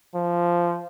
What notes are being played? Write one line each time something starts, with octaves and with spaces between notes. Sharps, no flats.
F3